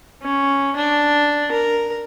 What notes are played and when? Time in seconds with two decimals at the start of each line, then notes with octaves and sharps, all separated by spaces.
0.22 C#4
0.76 D4
1.52 A#4